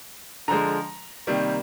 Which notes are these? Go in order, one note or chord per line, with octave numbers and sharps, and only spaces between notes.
D3 F3 G#3 A#5
C3 D#3 G3 A#3